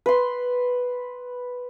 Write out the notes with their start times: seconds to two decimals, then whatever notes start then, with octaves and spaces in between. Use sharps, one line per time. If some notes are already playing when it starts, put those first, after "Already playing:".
0.06 B4 C6